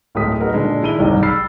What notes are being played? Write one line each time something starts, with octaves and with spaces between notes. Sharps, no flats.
D1 A2 G#3 A#4 D#6 B6
B3 D#4 F#4 A#4
A#2 D3 G#3
D#3 E4 D#7 G7
F#1 C2 G#2 C3 D#3
B5 E6 F6 A6 C7